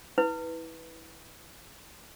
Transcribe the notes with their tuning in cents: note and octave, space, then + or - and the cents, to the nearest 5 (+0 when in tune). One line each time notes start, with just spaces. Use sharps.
E4 -25 B4 +0